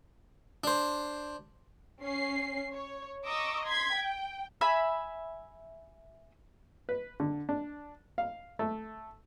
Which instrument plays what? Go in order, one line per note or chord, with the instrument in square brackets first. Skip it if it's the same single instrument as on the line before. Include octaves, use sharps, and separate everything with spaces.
[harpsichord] D4 C5
[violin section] C#4 C7
C#5
D#5 A#5 C#6 D6 E6
C6 G#6 B6
G5
[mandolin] E5 G#5 B5 E6
[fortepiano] B4
D3
D4
F5
A3